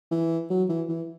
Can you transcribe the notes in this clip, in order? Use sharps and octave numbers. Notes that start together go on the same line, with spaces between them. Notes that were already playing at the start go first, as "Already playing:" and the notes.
E3
F#3
E3
E3